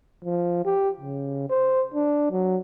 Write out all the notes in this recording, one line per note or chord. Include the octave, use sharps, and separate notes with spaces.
F3
G4
C#3
C5
D4
F#3